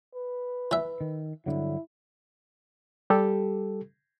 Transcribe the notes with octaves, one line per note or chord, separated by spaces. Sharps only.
B4
E3 E5
D#3
G2 D3 F#3 E4
G3 G4 A4